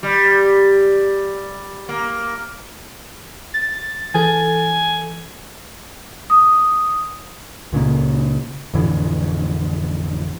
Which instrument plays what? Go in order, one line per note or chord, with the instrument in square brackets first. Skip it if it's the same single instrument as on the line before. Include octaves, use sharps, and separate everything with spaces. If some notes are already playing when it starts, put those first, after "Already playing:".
[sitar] G3
A#3
[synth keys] A6
[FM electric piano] E3 A4 [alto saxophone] G#5
[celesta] D#6
[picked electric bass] C#2 A#2 C#3 A#3
A1 F2 D3 E3